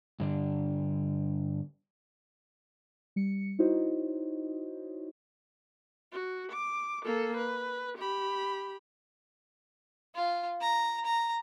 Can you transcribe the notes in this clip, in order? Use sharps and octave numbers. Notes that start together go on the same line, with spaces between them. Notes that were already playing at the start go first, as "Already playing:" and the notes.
G2 D3 D4
G3 C#7
D#4 E4 F#4 C5 C#5 D#5
F#4
D6
A#3 A4
B4
G4 B5
F4
A#5
A#5